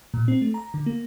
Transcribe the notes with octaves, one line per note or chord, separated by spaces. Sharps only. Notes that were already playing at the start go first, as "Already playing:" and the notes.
A#2
C4
A3
A#5
D3
A#3